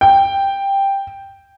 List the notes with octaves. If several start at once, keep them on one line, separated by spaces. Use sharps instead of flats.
G5